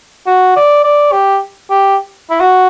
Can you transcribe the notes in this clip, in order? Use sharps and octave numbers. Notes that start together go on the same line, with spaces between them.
F#4
D5
D5
G4
G4
E4
F#4